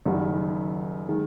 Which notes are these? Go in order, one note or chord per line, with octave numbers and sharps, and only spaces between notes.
F#1 F#2 D#3 G3
D#3 G#3